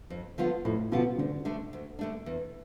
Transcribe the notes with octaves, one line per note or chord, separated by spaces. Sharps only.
F2
D3 F3 B3 F4
F2 A2
B2 D3 F3 B3 F4
D2 D3
D3 A3 D4
D2
D3 A3 D4
E2